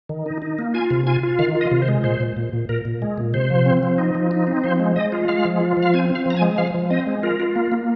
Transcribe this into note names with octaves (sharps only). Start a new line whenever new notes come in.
D#3
D#4
D#4
A#3
F4 G#5
C3
F4 G#5
F4
D#3 F5
F4
D#5
C3
C5
G#3
A#2 C5
A#2
A#2
A#2
A#2 A#4
A#2
G#3
A#2
C3 C5
F3
C4
F3
D#4
F3
D#4
C4
F3 C5
G#3
G#3 D#5
F4
G#3 F5
F3
F4
F3
F5
C4 G#5
C4
F5
F3 A#5
G#5
G#3
F3 F5
F3
C4 D#5
G#3
F4 A#4
F4
A#3
A#3